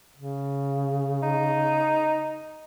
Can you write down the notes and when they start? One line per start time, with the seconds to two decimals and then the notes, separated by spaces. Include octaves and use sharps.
0.17 C#3
1.22 D#4